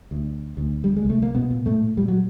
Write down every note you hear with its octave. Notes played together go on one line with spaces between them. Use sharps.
D2
D2
G3
G#3
C2
A3
A#3
B2 B3
A#2
A2 A3
A#2 G3
F#3